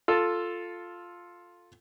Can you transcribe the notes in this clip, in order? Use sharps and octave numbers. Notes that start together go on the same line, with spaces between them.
F4 A4